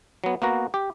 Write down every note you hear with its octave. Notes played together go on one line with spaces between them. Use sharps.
F#3 B3
A#3 B3 F#4 A#5
G4